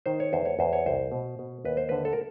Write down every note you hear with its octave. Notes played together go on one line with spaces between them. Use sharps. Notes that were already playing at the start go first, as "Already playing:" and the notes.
D#3 C5
C#5
E2 C5
C#5
E2 C5
C#5
C2 C5
B2
B2
D#2 B4
C5
D3 B4
A4
A#4